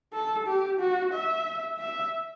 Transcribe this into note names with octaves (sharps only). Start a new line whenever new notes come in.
A4
G4
F#4
E5
E5